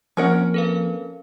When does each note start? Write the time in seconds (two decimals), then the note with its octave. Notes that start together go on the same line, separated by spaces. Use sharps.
0.17 F3 A#3 C4 C#4 A#4 F#5
0.54 A4 B4 F5